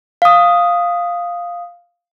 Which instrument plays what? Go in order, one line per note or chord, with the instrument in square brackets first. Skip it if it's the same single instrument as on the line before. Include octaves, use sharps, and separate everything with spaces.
[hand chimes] F5 D#6